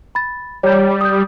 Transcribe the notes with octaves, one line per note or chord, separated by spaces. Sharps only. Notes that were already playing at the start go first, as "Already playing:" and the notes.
B5 A6
G3 C#5 A#5 G6
D#6 G6